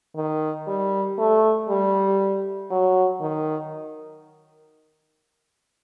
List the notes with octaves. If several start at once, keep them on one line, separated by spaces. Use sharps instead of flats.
D#3
G3
A3
G3
F#3
D#3